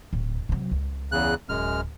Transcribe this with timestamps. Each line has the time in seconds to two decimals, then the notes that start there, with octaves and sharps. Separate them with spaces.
0.13 D1
0.49 C3 F#3
0.71 C#2
1.12 E2 C#3 F#6
1.49 D1 F#2 G#3 F6